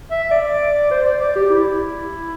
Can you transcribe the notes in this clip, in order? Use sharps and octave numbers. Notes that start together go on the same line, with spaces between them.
E5
D5
C5
D5
D5
G4
E4